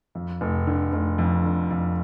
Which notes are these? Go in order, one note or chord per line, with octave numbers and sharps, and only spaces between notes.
F2
F1
D3
F1
F2
D3
F2